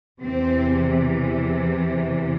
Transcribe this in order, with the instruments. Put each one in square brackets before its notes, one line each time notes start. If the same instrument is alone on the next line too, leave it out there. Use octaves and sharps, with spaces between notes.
[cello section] E2 C3 E3 C4